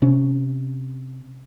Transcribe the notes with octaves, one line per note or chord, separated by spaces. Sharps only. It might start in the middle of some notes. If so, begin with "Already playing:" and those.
C3 C#4